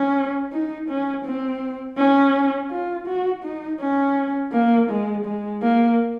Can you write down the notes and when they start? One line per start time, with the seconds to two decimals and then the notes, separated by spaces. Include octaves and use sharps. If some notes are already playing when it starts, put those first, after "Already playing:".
Already playing: C#4
0.52 D#4
0.89 C#4
1.25 C4
1.98 C#4
2.70 F4
3.07 F#4
3.43 D#4
3.81 C#4
4.53 A#3
4.90 G#3
5.25 G#3
5.62 A#3